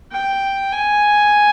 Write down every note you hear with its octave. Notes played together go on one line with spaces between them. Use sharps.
G5
G#5